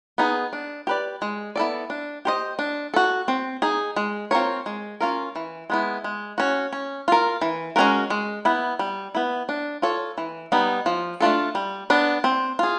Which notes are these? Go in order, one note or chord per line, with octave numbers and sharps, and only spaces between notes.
B3 D#4 G#4
D4
G4 B4 D5
G#3
B3 E4 A4 D5
D4
G4 C5 D#5
D4
F#4 A4
C4
D#4 G#4
G#3
C4 F4 A#4 C#5
G#3
C#4 F4 A#4
E3
G#3 B3 E4
G#3
C#4 F#4
C#4
F4 A#4
E3
G#3 C#4 F#4 A#4
G#3
B3 E4
G3
B3 E4
D4
F4 A4 C#5
E3
G3 B3 D#4
F3
A3 D4 F4 A4
G3
B3 D4
C4
F4 G#4